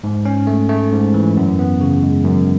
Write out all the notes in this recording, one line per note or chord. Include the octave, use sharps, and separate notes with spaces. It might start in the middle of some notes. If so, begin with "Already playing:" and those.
G#2
C#4
A3
A3
G#2
E3
F#2
B3
C#3
G#3
F#2